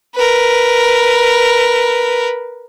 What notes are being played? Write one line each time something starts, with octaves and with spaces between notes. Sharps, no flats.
A#4 B4